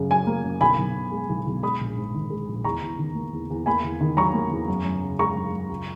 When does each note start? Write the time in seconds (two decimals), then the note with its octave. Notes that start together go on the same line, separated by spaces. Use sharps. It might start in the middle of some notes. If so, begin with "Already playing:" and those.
Already playing: F#2 C#3
0.10 F#3 G#5
0.27 A#3
0.44 F#2
0.61 B1 G#5 B5
0.78 B1
0.95 B2
1.12 G#3
1.29 B1
1.47 B1
1.63 G#3 B5 D#6
1.81 A#1
1.98 G#2
2.15 D#3
2.30 G#3
2.48 A#1
2.64 E2 A#5 C#6
2.82 E2
2.99 D#3
3.15 A#3
3.33 E2
3.50 E2
3.66 A#3 G#5 B5
3.84 E2
4.01 D#3
4.17 F#3 A#5 C#6
4.34 A#3
4.51 E2
4.68 F#2
4.85 F#2
5.02 C#3
5.19 G#3 A#5 C#6
5.36 F#2
5.53 F#2
5.70 C#2